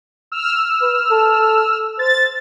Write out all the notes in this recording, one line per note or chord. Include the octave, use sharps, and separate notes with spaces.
E6 F6
B4
A4
C5 A6